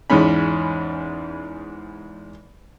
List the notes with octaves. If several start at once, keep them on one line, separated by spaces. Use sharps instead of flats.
E2 G#2 G#3 C#4 B5